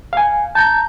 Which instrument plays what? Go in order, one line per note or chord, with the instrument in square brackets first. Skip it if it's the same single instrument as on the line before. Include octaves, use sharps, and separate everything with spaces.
[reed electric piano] F5 G#5
[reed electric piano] A5 A#5 [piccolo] G6